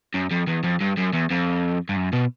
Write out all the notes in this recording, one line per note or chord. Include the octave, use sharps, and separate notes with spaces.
F#2
F2
E2
F2
G2
F#2
E2
F2
G2
F#2
B2